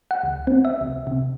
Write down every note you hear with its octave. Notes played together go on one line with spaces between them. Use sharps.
F#5
C#2
C4
E5
C2
C3